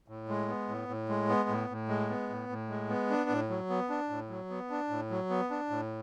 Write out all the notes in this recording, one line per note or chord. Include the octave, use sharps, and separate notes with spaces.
A2
G#3
B3
A2
A2
G#3
B3
A2
A2
G#3
B3
A2
A2
G#3
B3
D4
A2
F#3
B3
D4
A2
F#3
B3
D4
A2
F#3
B3
D4
A2